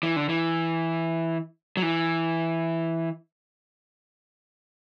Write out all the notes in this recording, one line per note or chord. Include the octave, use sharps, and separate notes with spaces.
E3
D3
E3
F#3
E3